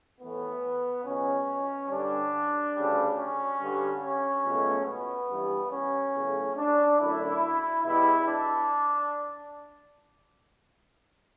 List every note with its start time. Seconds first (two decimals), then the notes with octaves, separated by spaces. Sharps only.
0.20 A2 E3 A3 B3
1.05 C#2 B2 F#3 C#4
1.90 G2 D3 G3 D4
2.75 D2 C#3 G3
3.17 C#4
3.60 G2 D3 G3
4.02 C#4
4.44 C#2 B2 F#3 A3
4.87 B3
5.29 G2 E3 G3
5.72 C#4
6.14 E2 C#3 F#3 A3
6.57 D4
6.99 F#2 D3 A3 E4
7.83 E2 B2 G3 E4
8.26 D4